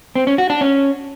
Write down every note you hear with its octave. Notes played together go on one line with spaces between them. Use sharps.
C4
C#4
F#4
D4
C#4